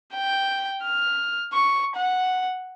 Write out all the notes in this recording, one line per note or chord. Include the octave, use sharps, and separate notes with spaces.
G5
F6
C#6
F#5